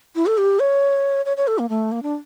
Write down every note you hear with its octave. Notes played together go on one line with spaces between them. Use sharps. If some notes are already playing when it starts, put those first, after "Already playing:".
E4
A4
G4
C#5
C#5
C#5
A4
A#3
A3
A#3
D4